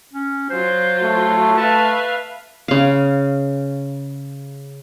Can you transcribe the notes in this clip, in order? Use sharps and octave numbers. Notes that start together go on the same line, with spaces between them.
C#4
F#3 F4 C5
A3
B4 E5 F5 A5
C#3 F5